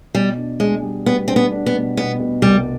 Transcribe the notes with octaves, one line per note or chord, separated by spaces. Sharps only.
B2 G3
D4
G#3 D4
G3
G3 B3
C4 D4
B3
D4
B3
B2
B2 B3
B2
C2 G3